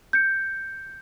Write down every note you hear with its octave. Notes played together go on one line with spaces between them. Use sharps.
G6 C#7